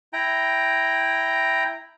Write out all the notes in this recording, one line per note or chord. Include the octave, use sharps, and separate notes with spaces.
E4 G5 A#5